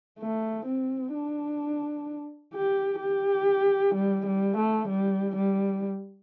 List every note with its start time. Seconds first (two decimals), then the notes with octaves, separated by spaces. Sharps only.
0.20 A3
0.66 C4
1.14 D4
2.55 G4
3.01 G4
3.95 G3
4.27 G3
4.58 A3
4.89 G3
5.36 G3